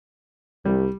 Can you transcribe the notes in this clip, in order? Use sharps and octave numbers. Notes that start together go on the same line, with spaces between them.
C2 G3